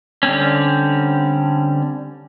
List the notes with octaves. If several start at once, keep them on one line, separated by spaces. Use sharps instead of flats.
D3 G3 C4 C#4